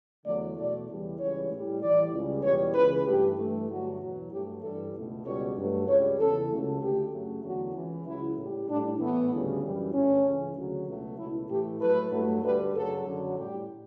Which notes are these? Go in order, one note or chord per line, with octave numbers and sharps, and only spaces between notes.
E2 D3 F#3 A3 D5
E2 B2 F#3 A3 D5
E2 C#3 E3 G3
C#2 C#3 E3 G3 C#5
A2 G3
A2 E3 G3 D5
C#2 C#3 G3
E2 B2 G3 C#5
C#2 C#3 E3 B4
G2 E3 A3 G4
G2 E3 A3
G2 D3 F#3 A3 F#4
E2 B2 F#3
G2 F#3 A3 G4
G2 E3 G3 A4
C#2 B2 A3
C#2 B2 G3 C#5
G2 F#3 A3
C#2 C#3 G3 C#5
E2 C#3 E3 A4
C#2 C#3 F#3 A3
D2 D3 A3 G4
F#2 C#3 F#3 A3
E2 D3 F#3 A3 F#4
C#2 C#3 E3
C#2 C#3 F#3 E4
A2 G3
A2 G3 D4
A2 E3 A3 B3
D2 C#3 G3
F#2 E3 G3
G2 D3 A3 C#4
C#2 C#3 E3
D2 C#3 F#3
C#2 B2 F#3 A3
C#2 B2 A3 E4
A2 E3 A3 G4
A2 F#3 A3 B4
G2 F#3 A3
D2 D3 G3 B4
F#2 C#3 F#3 A4
F#2 D3 F#3
A2 G3 G4